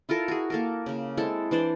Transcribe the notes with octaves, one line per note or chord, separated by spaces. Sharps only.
E4 F4 A4 A#4
F#4 G#4
A#3 A4 A#4
C#3 A#3
G#3 C4 E4 A4
E3 D4 C5 D5